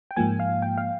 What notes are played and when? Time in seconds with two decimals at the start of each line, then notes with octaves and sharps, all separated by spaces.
0.11 G5
0.16 G#2 F3 A#3 G#5
0.40 F5
0.62 G5
0.78 F5